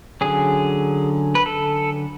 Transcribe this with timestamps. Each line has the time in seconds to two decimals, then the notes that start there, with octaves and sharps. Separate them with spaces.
0.21 D3 F#3 C#4 G#4
1.35 B4
1.46 A4